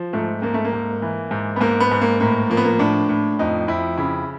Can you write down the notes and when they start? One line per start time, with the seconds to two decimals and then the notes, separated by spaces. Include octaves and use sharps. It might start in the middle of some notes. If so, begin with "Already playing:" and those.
Already playing: F3
0.13 G#2 A3
0.42 G#2 A#3
0.54 A3
0.64 A#3
0.73 G#2
1.02 E3
1.31 G#2
1.56 B3
1.61 G#2 A#3
1.80 B3
1.91 G#2
2.01 A#3
2.20 A2 A#3
2.50 F3 A#3
2.57 B3
2.64 A#3
2.79 A2 D4
3.09 A2
3.39 F2 D#4
3.68 F2 E4
3.97 C#3 E4